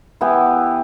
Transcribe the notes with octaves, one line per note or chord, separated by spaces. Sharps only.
E3 B3 E4 G4